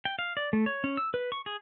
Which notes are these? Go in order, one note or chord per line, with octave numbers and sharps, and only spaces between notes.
G5
F5
D5
A3
C#5
C#4
E6
B4
C#6
G#4